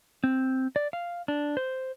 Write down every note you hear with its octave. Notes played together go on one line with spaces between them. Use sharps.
C4
D5
F5
D4
C5